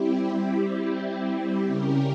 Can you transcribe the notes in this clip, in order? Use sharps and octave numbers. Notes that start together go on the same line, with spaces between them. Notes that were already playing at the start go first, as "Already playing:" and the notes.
Already playing: G3 C4 E4 G4
C#3 G3 C#4 G4 A#4